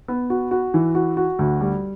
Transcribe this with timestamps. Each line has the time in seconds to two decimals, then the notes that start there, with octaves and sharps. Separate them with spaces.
0.08 B3
0.30 F#4
0.51 F#4
0.74 E3
0.95 F#4
1.17 F#4
1.39 D2
1.61 G3